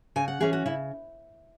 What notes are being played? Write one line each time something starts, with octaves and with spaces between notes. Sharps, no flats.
C#3 G#5
F#5
E3 C#4 G#4
F#4
C#3 E4